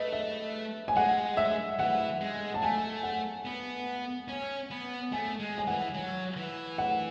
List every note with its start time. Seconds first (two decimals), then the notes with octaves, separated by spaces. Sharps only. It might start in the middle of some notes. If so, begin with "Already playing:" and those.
Already playing: A3 B4 D#5
0.13 E5
0.88 G#5
0.96 G#3 F#5
1.37 E5
1.79 E3 F#5
2.21 G#3
2.54 A5
2.62 A3 G#5
3.03 F#5
3.45 B3
4.28 C#4
4.70 B3
5.12 A3 G#5
5.40 G#3
5.58 G#5
5.67 E3 F#5
5.94 F#3
6.37 E3
6.78 F#5